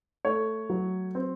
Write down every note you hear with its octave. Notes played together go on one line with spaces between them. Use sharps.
A3 C#5
F#3
C4